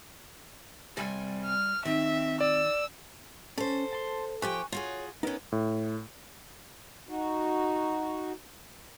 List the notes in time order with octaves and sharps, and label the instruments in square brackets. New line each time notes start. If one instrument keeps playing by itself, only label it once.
[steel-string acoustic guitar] C3 G5 G#5 [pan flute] G3
[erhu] F6
[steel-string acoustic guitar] D#3 [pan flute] C4 [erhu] E5
[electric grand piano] D5 [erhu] E6
[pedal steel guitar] C#4 [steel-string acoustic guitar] A4 C5
[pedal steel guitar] A5 C6
[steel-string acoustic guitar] F3 G4 G5 [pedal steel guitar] G#5 C#6 F#6
[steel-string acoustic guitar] F4 F#4 G#4 [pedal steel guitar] C#5
[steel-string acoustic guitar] B3 C#4 [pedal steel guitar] D#4 A#4 B4
[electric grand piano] A2
[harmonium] D#4 F#4